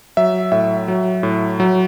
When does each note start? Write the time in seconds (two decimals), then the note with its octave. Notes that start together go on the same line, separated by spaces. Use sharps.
0.17 F#3 E5
0.52 A2 E5
0.88 F#3
1.23 A2
1.60 F#3